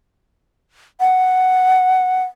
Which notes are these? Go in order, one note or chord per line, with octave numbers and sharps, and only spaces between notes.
F#5